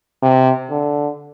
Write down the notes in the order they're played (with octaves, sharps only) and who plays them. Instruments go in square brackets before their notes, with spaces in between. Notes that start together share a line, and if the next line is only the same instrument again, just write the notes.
[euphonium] C3
D3